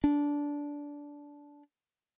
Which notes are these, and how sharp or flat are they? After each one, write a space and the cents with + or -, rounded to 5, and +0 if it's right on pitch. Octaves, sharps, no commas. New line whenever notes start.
D4 -15